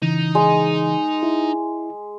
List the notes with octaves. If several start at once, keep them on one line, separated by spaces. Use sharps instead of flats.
C#3 E3 D#4
G#3
E4